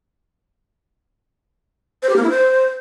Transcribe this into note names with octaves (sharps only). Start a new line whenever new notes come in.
C5
G4
A#3
E4
C5